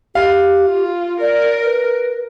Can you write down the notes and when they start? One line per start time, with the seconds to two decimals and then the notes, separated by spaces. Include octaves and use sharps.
0.15 G4 F5
0.65 F4
1.20 A#4 D5
1.65 B4